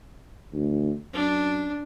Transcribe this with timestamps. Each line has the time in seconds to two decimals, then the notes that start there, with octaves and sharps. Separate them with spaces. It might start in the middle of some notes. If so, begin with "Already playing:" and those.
0.53 D2
1.14 F#2 D4